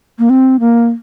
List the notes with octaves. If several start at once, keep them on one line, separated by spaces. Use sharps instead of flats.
A#3
C4
A#3